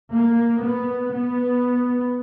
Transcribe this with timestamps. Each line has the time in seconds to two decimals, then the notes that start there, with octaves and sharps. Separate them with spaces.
0.14 A#3
0.64 B3
1.14 B3